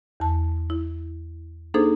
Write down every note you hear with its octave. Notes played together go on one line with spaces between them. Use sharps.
E2 A5
E4
A#3 D4 D#4 G#4 A4 C5